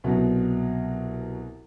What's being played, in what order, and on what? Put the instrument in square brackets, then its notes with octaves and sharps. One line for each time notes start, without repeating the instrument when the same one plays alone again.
[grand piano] C2 B2 F#3